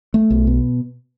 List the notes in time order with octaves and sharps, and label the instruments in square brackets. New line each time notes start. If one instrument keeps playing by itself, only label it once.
[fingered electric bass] A3
B1
B2